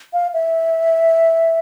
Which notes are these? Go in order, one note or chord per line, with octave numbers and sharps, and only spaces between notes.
F5
E5